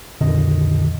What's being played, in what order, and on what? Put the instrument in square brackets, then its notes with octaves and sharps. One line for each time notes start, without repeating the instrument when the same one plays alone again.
[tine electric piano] C2 F2 A#2 D3 D#3 D#5